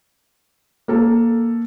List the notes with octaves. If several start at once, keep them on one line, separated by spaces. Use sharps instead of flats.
A#3 A4